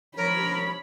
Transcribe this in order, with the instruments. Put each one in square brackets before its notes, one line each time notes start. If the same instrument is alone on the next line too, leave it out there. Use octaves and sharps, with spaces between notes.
[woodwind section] F3 C#5 [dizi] A#4 [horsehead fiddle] B5